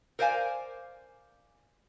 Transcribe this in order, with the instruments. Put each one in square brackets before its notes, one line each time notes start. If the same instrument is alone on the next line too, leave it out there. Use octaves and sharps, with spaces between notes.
[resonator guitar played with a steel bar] A#4 C5 D5 F5 G#5